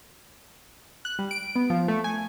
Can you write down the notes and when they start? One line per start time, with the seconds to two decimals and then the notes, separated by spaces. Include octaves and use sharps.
1.05 F#6
1.19 G3
1.31 D7
1.56 B3
1.70 F3
1.88 A3
2.04 G#5